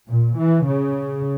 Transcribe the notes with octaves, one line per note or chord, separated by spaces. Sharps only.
A#2
E3
C#3